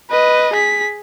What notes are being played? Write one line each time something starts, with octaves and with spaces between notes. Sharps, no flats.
B4 D#5
G#4 B6